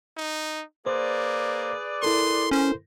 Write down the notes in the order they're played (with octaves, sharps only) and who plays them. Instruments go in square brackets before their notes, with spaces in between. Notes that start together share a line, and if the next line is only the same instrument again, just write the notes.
[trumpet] D#4
[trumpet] A#3 [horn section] G#4 B4 D5 [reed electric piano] C5
[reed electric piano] E4 A4 A#4 [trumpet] C6
[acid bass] C#4 [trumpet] C5